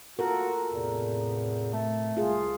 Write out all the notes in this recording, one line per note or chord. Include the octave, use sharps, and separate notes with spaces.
F4 F#4 A4 A#4
E2 A2 C3
A3
C2 F4 G#4